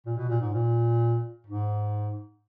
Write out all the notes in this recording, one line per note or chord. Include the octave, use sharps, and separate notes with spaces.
A#2
B2
A#2
G#2
A#2
G#2